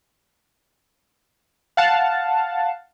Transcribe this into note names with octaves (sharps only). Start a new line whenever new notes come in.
F5 F#5 A5